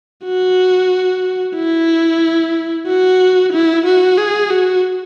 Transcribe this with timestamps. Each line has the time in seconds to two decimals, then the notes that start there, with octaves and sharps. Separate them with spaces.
0.25 F#4
1.56 E4
2.87 F#4
3.52 E4
3.85 F#4
4.17 G#4
4.50 F#4